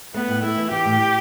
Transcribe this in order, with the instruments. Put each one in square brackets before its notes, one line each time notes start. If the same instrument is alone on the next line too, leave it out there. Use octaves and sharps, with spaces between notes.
[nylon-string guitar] A3 [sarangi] B3
[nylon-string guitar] A2
[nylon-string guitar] A3 [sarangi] E4
[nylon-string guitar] E3
[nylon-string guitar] E3 [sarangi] G4
[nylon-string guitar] A2
A2